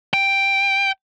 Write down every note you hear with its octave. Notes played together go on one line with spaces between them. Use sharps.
G5